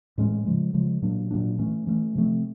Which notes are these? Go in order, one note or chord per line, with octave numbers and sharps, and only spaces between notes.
A2 E3 G#3 C#4
C#3 F3 G#3
C#3 F3 G#3
A#2 F#3 A#3 D4
A#2 F#3 A#3 D4
E3 A3 C#4
E3 A3 C#4
C3 F3 A3 C4